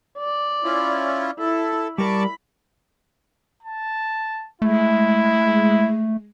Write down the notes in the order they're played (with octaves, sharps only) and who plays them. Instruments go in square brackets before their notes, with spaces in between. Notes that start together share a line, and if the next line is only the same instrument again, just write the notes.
[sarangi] D5
[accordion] C#4 E4 F4
[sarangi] E4 [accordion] A4
[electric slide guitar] G3 A#4 D5 [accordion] A5 C#6 D6 [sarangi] B5
[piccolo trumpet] A5
[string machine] G#3 [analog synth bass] A3 [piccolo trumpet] E4